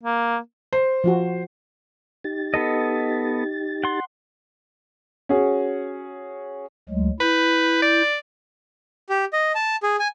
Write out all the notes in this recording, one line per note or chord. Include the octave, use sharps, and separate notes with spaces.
A#3
C5
F3 F4 F#4
D#4 G4 A6
B3 A4 D#5
F#5 C6
C#4 F#4 G#4
D2 F#3 G#3
E4 B4 G6
D5
G4
D#5
A5
G#4
G#5